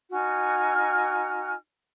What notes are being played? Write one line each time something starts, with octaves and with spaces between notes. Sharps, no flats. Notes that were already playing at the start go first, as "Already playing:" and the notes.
D#4 F#4 G#5 F6